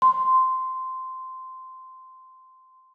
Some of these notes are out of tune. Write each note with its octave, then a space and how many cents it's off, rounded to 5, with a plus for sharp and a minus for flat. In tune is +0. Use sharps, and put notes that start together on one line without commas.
C6 -10